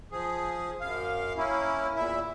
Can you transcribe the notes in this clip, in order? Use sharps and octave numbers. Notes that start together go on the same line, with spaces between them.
F3 G#4
F#2 F5
A#3 C#4 E4
E2 A#2 E4 E5